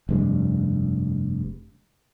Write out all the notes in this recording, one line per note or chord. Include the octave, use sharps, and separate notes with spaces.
F1 G2 G#3